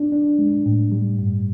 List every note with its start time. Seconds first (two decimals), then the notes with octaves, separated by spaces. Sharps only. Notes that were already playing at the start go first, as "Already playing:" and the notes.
Already playing: D4
0.12 D4
0.38 G#3
0.66 A2
0.92 G3
1.19 G2